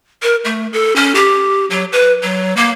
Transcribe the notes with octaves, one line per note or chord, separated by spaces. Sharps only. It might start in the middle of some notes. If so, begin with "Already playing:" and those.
A#4
A3
A4
C#4
G4
F#3
B4
F#3
A#3